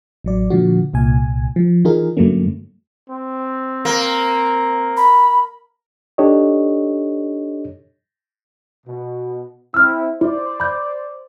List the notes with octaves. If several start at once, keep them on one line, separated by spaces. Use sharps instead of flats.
A1 F#3 D5
A#2 D3 F3 F#4
C2 A#2 G#5
F3
E3 D#4 F4 G#4 A#4
G2 D3 F#3 A3 A#3 C#4
C4
A#3
B5
D4 D#4 G4 A4 C#5 D#5
B2
C4 E4 E6 F6
E4 C5 D5
B5 G6